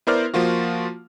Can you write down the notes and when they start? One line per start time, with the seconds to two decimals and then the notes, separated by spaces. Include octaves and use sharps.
0.07 B3 E4 A#4 C5 D5 F6
0.34 F3 A#3 F4 F#4